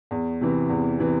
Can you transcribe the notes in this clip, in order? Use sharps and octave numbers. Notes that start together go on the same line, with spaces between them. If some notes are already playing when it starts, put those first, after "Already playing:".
E2
C3 E3
E2
C3 E3